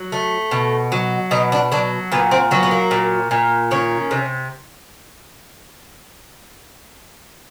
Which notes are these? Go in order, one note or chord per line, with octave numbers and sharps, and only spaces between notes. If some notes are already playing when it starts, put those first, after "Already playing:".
Already playing: F#3
A3
B2
F#3
B2 D#4
D4
F#3 D4
A#2 B3
C4
F#3 B3
B3
A#3
A#2
A#2
D#3 C#4
C3